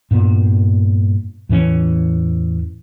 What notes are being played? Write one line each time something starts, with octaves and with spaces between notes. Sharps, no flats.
G2 A#2 B3
E2 A2 E3 C#4